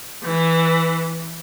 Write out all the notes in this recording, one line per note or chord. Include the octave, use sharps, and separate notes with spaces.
E3